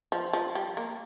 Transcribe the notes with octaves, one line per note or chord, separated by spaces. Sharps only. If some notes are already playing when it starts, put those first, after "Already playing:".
F3
F3
G3
A#3